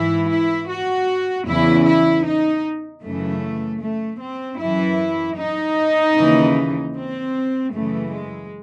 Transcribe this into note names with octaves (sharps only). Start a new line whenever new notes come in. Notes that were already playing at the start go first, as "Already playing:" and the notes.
Already playing: G#2 E3 E4
E4
F#4
E2 C#3 E3 E4
E4
D#4
F#2 C#3 E3 A3
A3
C4
F#2 E3 E4
D#4
D#2 C#3 E3
C4
F#2 C#3 E3 A3
G#3